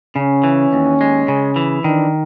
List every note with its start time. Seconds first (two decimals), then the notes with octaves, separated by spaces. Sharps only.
0.16 C#3 C#4
0.44 E3
0.73 D#2
1.01 G#3
1.28 C#3
1.56 E3
1.84 D#3 D4